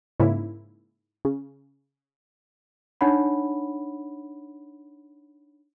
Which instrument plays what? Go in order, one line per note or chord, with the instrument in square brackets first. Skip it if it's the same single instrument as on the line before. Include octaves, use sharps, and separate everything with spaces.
[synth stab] G#2 C#3 A#3 E4
C#3
[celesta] D4 D#4 C#5 F#5 B5